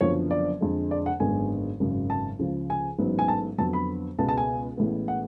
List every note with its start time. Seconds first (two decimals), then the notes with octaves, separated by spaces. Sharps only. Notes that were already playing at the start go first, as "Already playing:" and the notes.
0.01 F#1 F#2 D3 F3 B3 C#5
0.31 D5
0.61 F2 D3 G#3
0.91 D5
1.06 F#5
1.20 G#1 F#2 D3 G#3 B3 G#5
1.80 G#1 F#2 C#3
2.10 A5
2.39 C#2 C#3 F3
2.70 G#5
2.99 A1 G#2 F#3 B3
3.19 G#5
3.28 A5
3.58 F2 D3 F#3 B3 A5
3.73 B5
4.18 C#2 B2 G#3 B3 A5
4.29 A5
4.38 G#5
4.77 A1 A2 G#3 B3
5.08 F#5